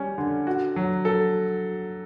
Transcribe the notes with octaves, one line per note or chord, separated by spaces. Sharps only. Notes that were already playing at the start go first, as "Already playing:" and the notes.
Already playing: G3 C#4
D3
F#4
F#3
A4